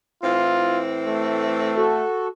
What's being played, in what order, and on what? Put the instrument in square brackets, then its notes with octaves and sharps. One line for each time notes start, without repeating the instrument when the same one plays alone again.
[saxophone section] A2 E3 C4 [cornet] F4
[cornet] A3
[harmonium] F#4 A4